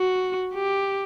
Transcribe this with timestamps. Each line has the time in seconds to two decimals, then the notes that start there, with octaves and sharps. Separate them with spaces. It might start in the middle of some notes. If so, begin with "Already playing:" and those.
Already playing: F#4
0.54 G4